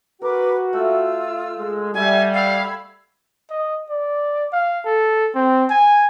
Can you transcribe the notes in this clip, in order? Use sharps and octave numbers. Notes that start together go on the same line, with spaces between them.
F#4 A#4 B4 D6
A3 F4 E6
G#3
G3 F#4 E5 G#5
F5 B5 E6 G#6
D#5
D5
F5
A4
C4
G#5